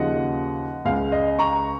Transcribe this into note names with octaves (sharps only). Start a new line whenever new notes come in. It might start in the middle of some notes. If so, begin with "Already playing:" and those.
Already playing: D#2 C#3 F3 D#5 F#5
C#2 C#3 G#3 F5
D#5
A#5 C#6